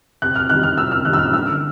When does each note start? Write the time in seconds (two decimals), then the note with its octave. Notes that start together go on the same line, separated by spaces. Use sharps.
0.22 C3 F#6
0.35 F6
0.49 D#3 G3 F#6
0.63 F6
0.77 C3 E6
0.91 F6
1.05 D#3 G3 F#6
1.13 E6
1.19 F6
1.33 D3 E6